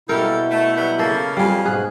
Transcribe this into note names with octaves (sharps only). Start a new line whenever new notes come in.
B2 G3 A#3 E4 A4 A#4 G6
A3
F#3 G3 B3
C#3 A#3 A4
F2 G3 G#4 F5
G#2 B2 G#4 F#6